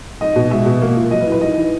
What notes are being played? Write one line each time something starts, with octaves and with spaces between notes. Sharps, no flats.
D#4 D#5
B2
G#3 E5
B2
A#3
A#2
F#3 D#5
B4
E4
B4
D#4 D#5
E3